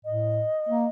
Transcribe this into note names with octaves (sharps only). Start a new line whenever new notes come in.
A2 D#5
A#3